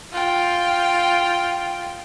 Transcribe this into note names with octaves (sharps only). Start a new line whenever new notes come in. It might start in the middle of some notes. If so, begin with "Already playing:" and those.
F4 G5